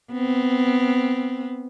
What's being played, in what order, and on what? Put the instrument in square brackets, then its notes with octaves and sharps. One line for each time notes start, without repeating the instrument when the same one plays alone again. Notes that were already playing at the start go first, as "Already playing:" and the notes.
[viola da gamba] B3 C4